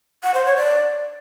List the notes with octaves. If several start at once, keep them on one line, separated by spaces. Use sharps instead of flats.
F#5
C5
C#5
D5